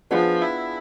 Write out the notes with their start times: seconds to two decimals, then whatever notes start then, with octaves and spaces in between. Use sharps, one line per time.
0.11 F3 B3 D4 G#4 D5
0.42 E4